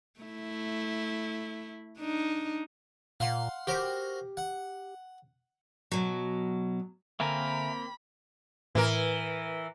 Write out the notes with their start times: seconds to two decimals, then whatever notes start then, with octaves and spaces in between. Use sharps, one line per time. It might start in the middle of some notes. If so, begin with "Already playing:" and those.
0.20 A3 E4
1.99 D4 D#4
3.20 A#2 F5 F#5 C6
3.67 F#4 G4 A#4 C5
4.37 F#5
5.92 B2 F#3
7.20 D3 A#3 C4 A#4 E5 G#5 A#5 B5
8.75 A2 E3 A#4